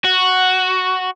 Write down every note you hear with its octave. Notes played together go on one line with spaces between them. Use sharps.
F#4